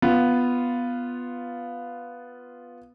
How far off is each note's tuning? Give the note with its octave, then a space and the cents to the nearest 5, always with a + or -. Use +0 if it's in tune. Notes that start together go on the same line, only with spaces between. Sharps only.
B3 +0 F4 +0